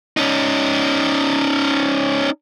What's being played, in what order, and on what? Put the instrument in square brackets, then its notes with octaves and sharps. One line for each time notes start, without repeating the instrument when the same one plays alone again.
[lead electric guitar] C#4 D#4